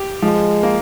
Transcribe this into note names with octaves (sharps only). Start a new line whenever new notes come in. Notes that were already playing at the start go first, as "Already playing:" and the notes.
Already playing: G4
F3 G#3
A#3